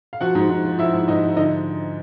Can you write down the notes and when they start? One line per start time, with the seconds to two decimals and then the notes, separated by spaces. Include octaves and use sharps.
0.13 F5
0.21 F3 F#4 F#5
0.35 G#2
0.50 G#2
0.65 F3
0.79 F3 E4 E5
0.94 G#2
1.08 G#2 D#4 D#5
1.23 F3
1.37 D3 D#4 D#5